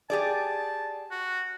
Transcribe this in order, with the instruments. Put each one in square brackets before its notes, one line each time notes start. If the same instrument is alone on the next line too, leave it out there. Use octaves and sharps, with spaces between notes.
[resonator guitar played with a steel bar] G4 G#4 D5 [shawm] A5
[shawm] F#4